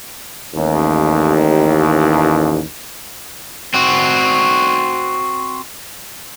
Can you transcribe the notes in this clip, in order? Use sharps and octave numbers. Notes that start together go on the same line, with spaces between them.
A1 D#2
C4 F#4